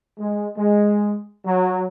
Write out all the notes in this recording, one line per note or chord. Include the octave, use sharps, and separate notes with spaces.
G#3
G#3
F#3